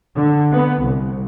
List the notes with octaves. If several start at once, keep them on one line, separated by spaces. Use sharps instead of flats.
D3
B3
C2